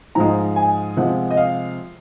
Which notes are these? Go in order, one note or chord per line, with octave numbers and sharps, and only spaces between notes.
G#2 F3 G#3 A#5
G#5
C3 F3 G#3 F#5
D#5
F5